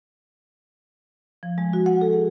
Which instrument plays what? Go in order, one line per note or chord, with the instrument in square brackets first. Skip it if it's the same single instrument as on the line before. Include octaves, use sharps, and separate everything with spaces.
[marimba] F3
G#3
F#4
F#5
A4
G#4